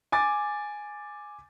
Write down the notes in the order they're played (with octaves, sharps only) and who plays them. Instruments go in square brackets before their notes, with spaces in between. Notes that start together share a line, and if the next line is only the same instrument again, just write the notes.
[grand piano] G#5 D6 A6